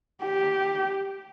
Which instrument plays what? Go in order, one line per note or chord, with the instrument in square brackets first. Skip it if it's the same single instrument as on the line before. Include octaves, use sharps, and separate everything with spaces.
[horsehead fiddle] G4